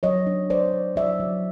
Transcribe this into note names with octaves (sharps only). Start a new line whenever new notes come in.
F#3 C#5 D#5
D4
F#3 C5 D5
F#3
F#3 D5 E5
F#3